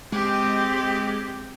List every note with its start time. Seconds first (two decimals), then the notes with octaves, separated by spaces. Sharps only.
0.12 G#3 C4 G4